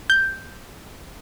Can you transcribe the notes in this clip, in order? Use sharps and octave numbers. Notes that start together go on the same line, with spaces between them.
G6